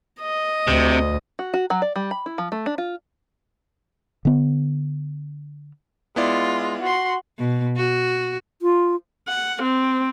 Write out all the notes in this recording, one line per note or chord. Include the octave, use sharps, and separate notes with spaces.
D#5
D2 C3
F#4
F#4
F#3
D5
G3
B5
E4
F3
A3
D4
F4
D3 B3
G#3 B3 E4 F4 D5
F#4 C6
B2
F#4
F4
F#5
C4